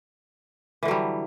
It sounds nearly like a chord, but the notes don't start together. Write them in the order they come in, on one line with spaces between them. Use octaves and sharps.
E3 D3 F#3 G3